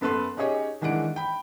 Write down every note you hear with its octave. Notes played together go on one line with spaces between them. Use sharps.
F#2 B3 A4 B4 C6
C#4 D#4 G4 G#4 C#5 D#5
D#3 E3 G#3 D4 F#5 D7
G5 B5